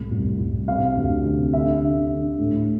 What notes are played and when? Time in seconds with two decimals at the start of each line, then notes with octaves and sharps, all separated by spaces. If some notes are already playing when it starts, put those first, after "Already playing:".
Already playing: C2 A2
0.11 C2
0.39 C2
0.67 C3 F5
0.96 D2
1.25 C3
1.53 D3 E5
1.82 D3
2.10 D3
2.38 A2